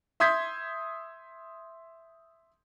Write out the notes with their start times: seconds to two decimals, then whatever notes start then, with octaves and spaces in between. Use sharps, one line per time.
0.20 E5 C6 D#6 G6 G#6 B6